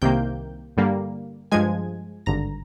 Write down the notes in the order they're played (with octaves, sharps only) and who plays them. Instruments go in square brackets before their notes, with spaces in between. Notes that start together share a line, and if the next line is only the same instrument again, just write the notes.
[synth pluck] C2 C3 D#3 A#3 G5 G6
G2 D3 G3 A#3
G2 F3 G#3 G#5 G#6
G#1 G2 D3 A#5 A#6